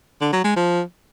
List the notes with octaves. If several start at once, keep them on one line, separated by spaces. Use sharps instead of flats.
D3
F#3
G#3
F3